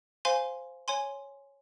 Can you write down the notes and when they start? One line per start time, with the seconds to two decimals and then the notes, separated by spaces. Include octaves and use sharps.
0.25 C5 F5 G#5 C6
0.88 C#5 G#5 C6